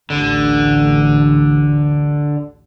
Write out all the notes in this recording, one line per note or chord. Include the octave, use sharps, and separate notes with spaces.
A1 D2 D3